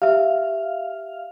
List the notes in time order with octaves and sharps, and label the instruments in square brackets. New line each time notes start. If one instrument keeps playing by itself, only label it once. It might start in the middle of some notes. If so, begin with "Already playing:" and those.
[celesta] G4 E5 [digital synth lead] F5